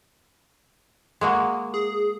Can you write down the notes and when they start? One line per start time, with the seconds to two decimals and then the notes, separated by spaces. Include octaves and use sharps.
1.21 G#3 A#3 F#4
1.74 G#4